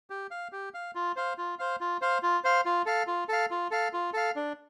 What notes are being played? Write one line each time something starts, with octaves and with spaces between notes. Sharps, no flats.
G4
F5
G4
F5
F4
C5 F5
F4
C5 F5
F4
C5 F5
F4
C5 F5
F4
A4 F5
F4
A4 F5
F4
A4 F5
F4
A4 F5
D4